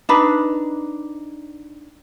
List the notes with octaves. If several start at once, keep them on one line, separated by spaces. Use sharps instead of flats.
D4 D#4 B4